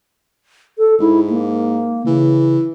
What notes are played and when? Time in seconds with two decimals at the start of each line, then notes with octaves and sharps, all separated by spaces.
0.78 A4
1.00 G#2 E4
1.30 A#3
2.07 C#3 E3